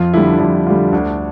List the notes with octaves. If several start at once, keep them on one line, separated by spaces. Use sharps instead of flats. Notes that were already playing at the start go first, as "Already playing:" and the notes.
Already playing: F2 F4
D3 G3 E4
D4
F2 E4
D3 G3 F4
D2 D4